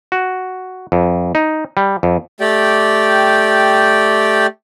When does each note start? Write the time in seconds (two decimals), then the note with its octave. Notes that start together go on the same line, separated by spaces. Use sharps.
0.12 F#4
0.92 F2
1.35 D#4
1.77 G3
2.03 F2
2.40 A3 G4 D5 G5